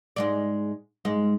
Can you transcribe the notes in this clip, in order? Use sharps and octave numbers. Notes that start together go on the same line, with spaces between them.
G#2 G#3 D5
G#2 G#3